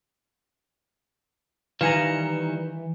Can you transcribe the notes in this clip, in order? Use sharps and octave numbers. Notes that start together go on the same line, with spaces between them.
D#3 E3 G3 B4 F5 G#5 A#5 C#7